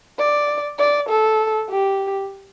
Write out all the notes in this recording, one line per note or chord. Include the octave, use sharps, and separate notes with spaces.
D5
D5
A4
G4